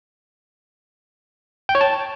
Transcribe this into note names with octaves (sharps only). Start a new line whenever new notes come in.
G5
C#5
A5